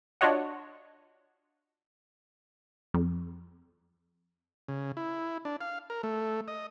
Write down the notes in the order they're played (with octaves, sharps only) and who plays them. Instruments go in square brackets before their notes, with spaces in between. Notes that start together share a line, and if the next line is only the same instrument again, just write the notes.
[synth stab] D4 F4 F#4 C#5 D#5 F#5
[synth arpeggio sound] F2
[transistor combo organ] C#3
E4
D4
F5
A#4
A3
D#5